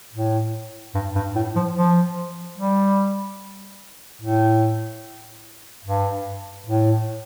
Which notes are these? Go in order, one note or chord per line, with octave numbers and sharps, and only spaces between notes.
A2
G2
G2
A2
F3
F3
G3
A2
G2
A2